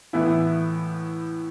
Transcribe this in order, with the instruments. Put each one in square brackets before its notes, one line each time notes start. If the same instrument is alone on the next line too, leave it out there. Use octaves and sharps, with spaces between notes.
[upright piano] A2 E3 B3 E4